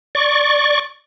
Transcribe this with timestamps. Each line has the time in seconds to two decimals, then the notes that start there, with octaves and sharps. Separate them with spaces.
0.15 D5 C#6